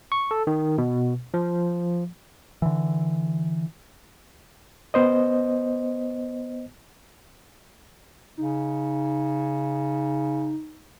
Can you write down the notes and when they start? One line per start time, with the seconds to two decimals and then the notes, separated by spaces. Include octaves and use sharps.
0.12 C#6
0.31 A4
0.47 D#3
0.78 B2
1.34 F3
2.62 D3 E3
4.94 B3 C5 D#5
8.37 C#3 D#4